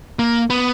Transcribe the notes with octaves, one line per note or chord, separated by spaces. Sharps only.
A#3
B3